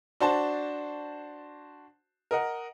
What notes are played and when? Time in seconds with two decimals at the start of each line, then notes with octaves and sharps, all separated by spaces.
0.20 D4 F#4 C5 A5
2.31 A#4 D#5 F#5